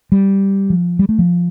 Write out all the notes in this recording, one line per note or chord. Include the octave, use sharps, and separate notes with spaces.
G3
F3
G3
A3
F3